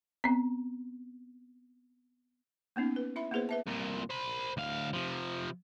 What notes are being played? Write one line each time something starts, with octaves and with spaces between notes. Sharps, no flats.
B3 C4
A#3 B3 C#4 D#4
B4
E4 E5 B5
A#3 B3 E4 G#4 B4 C5
B4 E5 A5
C2 A#2
C5 B5
D2 F5
C3 F3